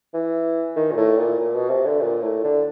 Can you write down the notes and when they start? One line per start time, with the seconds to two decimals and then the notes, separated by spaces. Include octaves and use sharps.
0.14 E3
0.76 D#3
0.92 A#2
0.97 A2
1.18 A#2
1.39 A#2
1.55 B2
1.70 C3
1.86 D3
2.02 A#2
2.23 A2
2.44 D3